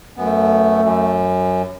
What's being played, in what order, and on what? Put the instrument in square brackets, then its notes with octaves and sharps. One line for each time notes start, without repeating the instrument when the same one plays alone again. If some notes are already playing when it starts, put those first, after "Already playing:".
[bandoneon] F#2 B3 [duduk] A3
[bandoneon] F#2